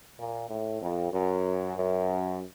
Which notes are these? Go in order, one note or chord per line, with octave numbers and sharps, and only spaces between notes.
A#2
A2
F2
F#2
F#2